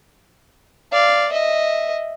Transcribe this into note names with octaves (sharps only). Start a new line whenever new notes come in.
D5 F5
D#5 E5